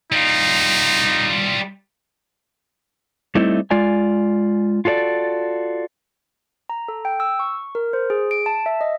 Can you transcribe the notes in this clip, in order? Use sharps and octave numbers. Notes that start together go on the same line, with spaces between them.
G3 D#4 F4
G3 A3 C4 D#4 E4
G#3 F4 D5 G#5
F4 F#4 A4 C#5 D5
A#5
A4
G5
E6
C#6
A#4
C5
G#4
D7
A5
E5
D#5